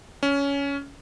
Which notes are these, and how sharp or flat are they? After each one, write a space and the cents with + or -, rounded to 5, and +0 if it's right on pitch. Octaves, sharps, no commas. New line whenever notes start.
C#4 +15